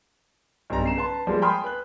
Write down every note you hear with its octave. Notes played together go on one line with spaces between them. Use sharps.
B1 G2 G3 A#5
C#3 C7 E7
B4 A5 C6
F3 G3 G#3 A#3
G5 G#5 B5 C6 D#6 F6
B4 F#6